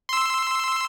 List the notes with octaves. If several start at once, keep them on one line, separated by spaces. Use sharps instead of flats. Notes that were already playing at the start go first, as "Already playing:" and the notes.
C6 E6